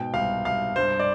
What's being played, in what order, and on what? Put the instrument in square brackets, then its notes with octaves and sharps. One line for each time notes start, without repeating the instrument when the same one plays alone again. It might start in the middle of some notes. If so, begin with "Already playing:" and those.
Already playing: [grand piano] G#2 B2 G5
C2 F5
C2 F5
G2 C5
D5